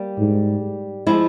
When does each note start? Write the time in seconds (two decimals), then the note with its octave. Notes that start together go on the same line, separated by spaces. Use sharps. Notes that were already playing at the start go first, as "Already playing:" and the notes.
Already playing: G3 A#3
0.18 G#2
1.07 F3 G#3 E4